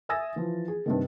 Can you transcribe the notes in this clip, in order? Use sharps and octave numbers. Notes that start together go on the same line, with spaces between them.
E5 G#5 D#6 E6 A6 A#6
E3 F3
G#4
G2 C3 D#3